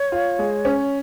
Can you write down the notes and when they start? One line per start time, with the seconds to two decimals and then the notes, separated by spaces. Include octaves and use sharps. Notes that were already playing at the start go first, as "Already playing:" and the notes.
Already playing: C#5
0.12 F4
0.39 G#3
0.65 C#4